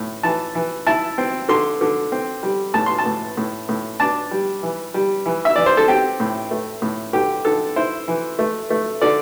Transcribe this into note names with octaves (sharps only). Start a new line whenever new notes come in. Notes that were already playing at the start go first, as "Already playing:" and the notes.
Already playing: A2
E3 A5
E3
E4 A5
C4
D3 C6
D3
C4
G3
A2 A5
C6
A5
A2
A2
A2
D4 A5
G3
E3
G3
E3
E5
E3 D5
C5
A4
C4 G4
A2
A3
A2
D3 G4
D3 A4
E4 C5
E3
A3
A3
D3 D5